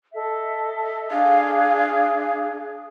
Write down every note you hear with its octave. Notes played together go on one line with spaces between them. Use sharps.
A4 D#5 E5
D4 G#4 F5